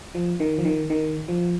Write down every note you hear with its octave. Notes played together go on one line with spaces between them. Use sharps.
F3
D#3
F3
D#3
D#3
F3